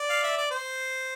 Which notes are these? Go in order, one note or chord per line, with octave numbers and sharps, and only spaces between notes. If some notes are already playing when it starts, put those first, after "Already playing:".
Already playing: D5
F5
E5
D5
C5